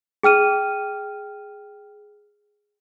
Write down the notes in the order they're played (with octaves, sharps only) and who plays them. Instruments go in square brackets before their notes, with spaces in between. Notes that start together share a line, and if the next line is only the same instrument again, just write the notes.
[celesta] G#4 G5 F6 D#7